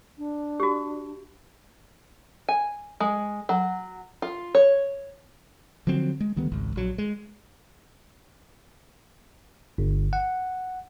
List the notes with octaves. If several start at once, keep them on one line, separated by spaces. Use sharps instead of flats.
D4
F#4 G4
G#5
G#3
F#3
F4
C#5
D3 F3 F#3 C4
G#3
D2 D#3 G3 B3
G#1 C#2
A#1 F#3
G#3
G1
F#5